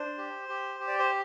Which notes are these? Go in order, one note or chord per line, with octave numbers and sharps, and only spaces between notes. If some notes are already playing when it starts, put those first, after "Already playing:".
Already playing: D4 C5
G4
G4
G4
D5
C5